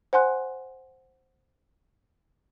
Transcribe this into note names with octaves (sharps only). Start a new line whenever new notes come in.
C5 F#5 G#5 C6 F#6